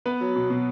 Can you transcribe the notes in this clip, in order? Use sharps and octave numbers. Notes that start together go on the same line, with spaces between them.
B3 B4
F#3
B2
B2